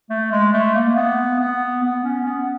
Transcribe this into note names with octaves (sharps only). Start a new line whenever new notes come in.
A3
G#3
A3
A#3
B3
B3
B3
C#4
B3